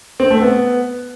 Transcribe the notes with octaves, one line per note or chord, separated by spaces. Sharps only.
C4
A3
B3